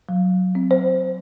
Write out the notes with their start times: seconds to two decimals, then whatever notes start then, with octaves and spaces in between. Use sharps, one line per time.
0.09 F#3
0.55 C4
0.71 C5